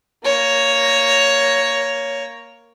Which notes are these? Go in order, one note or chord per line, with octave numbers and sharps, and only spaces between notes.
A#3 C#5